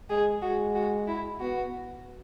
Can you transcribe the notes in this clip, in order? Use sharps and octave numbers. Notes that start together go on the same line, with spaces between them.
G#3 G#4
G#3 F#4
F#4
E4
B3 F#4